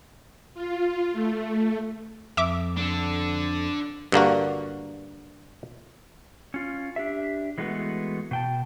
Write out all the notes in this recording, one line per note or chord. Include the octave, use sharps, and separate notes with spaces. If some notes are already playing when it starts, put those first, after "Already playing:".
F4
A3
F2 E5 D6
D4 A4
G2 D3 A#3 F#4
C#4 F4
D4 G4 E5
E3 G#3 A3 B3 F#4
B2 G5 A5